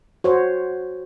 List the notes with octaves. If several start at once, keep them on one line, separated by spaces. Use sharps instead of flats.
F#4 C5 C#5